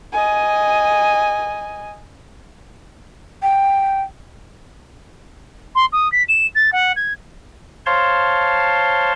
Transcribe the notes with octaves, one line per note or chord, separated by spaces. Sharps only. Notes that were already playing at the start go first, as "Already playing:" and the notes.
D#5 G#5
G5
C6
D#6
B6
E7
A6
F#5
G#6
C5 C#5 F5 A5 C6